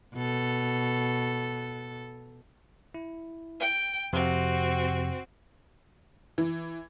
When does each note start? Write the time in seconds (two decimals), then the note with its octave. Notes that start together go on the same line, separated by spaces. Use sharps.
0.14 B2 A4
2.94 E4
3.60 G5
4.13 F2 C3 C4 F#4
6.38 E3